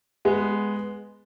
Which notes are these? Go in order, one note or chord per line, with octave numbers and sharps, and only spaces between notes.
G#3 B3